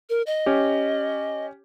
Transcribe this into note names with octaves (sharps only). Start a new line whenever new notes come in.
A#4
D#5
C#4 G4